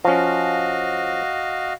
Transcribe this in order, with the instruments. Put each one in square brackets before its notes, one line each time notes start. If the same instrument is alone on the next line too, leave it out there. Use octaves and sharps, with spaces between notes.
[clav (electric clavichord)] F3 C#4 [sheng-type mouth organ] F#4 D#5 F5